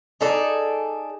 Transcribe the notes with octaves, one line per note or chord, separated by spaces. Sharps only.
D#4 G#4 A4 D5